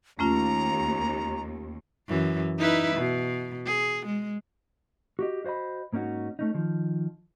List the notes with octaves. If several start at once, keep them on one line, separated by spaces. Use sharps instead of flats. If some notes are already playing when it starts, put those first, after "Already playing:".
D#2 A3 C#4 F4 A#5
F#2 E3
D#4 E4 B4
B2
G#4
G#3
F#4 G4 D#5
F#4 C5 D5 D#5 B5
G#2 A#3 C#4 D#4 F#4
A3 C#4 D#4
D#3 F3